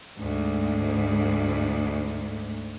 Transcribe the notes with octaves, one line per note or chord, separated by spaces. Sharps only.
D2 G#2